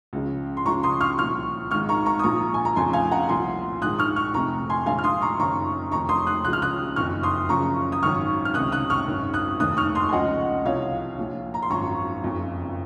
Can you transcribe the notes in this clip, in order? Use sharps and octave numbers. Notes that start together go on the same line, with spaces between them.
C#2 C#3 F3
C6
C#2 C#3 F3 A#5 C#6
C6 D#6
C#6 F6
C2 A#2 F3 C#6 F6
G#1 G#2 D#3 C#6 F6
A#5 C#6
A#5 C#6
D#6
A#1 A#2 F3 A#5 C#6
G#5
A#5
F1 F2 C#3 F3 G#5 C6
F5 G#5
F#5 A#5
C2 A#2 F3 G#5 C6
A#1 G#2 D#3 D#6 F#6
C#6 F6
C#6 F6
F1 F2 C3 A#5 C#6
G#5 C6
A#1 G#2 D#3 F5 G#5
F6
C6 D#6
A#5 C#6
F#1 F#2 D#3 A#5 C#6
F1 F2 D#3 A#5 C#6
C6 D#6
D#6 F#6
C#2 C#3 F3 F#6
F6
D#6 F#6
F#1 F2 D#3 C#6 F6
C6 D#6
F#1 F#2 C#3 F3 A#5 C#6
D#6
G#1 F#2 D#3 C#6 F6
F6
C#2 C3 D#3 D#6 F#6
D#6 F#6
C#6 F6
G#1 F#2 D#3
D#6 F#6
F1 D#2 D#3 D#6 F#6
C#6 F6
C6 D#6
G#5
C#2 C#3 F3 D#5 F#5
C2 C3 F3 C#5 F5
A#1 A#2 F3
A#5
C6
G#1 F#2 F3 A#5 C#6
F#1 F2 C#3 F3